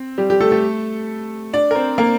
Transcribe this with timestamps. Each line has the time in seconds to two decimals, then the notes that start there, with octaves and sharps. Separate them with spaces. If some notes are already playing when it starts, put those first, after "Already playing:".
Already playing: C4
0.18 G3 G4
0.30 G3 G4
0.40 A3 A4
0.52 A3 A4
1.53 D4 D5
1.71 A#4
1.75 C4 C5
1.98 A#3 A#4